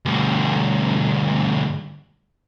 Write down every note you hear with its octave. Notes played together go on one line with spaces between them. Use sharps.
D2 G2